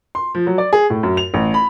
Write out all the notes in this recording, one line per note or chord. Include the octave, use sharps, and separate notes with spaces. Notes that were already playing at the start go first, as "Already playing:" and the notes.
C6
F3
F#3
D5
G#4
A2
F#2
F7
A1
B5